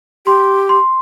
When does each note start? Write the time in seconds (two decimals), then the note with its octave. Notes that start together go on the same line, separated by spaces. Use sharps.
0.26 G4 C6
0.69 C6